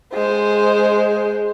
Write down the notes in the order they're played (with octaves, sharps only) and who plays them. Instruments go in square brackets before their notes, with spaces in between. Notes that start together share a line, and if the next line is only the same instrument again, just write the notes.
[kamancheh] G#3 C5